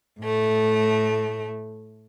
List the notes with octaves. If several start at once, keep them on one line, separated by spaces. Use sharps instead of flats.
A2 A3